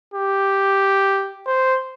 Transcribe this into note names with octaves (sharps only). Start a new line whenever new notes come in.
G4
C5